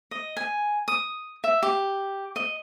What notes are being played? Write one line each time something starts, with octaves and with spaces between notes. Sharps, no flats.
D#5
G#5
D#6
E5
G4
D#5